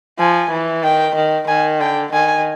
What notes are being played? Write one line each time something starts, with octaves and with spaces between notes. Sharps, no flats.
F3 G#5
E3
D#3 G5
D#3
D#3 G#5
D3 G5
D#3 G#5